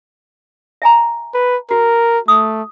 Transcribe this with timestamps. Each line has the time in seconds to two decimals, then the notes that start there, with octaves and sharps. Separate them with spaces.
0.82 E5 G#5 A#5
1.34 B4
1.71 F#4 A#4
2.28 A3 D#6